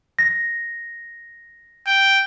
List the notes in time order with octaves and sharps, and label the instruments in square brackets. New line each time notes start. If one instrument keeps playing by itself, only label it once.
[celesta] A#6
[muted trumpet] G5